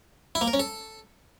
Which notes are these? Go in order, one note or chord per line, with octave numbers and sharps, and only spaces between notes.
E4
A#3
A#4
C#4
A4